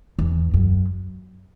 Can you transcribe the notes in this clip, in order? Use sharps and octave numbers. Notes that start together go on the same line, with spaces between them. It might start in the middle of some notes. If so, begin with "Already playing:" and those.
E2
F#2